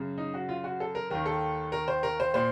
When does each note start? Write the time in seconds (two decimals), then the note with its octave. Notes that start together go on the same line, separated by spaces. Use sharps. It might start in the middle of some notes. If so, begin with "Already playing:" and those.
Already playing: F#2 C#3
0.18 D#4
0.34 F#4
0.49 F4
0.64 F#4
0.80 A4
0.95 A#4
1.10 D#2 D#3 A#4
1.26 A4
1.72 A#4
1.88 C5
2.03 A#4
2.20 C5
2.34 A#2 C5